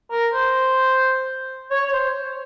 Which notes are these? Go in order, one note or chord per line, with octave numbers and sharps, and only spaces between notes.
A#4
C5
C#5
C#5
C5